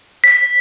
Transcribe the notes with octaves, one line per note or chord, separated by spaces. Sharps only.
B6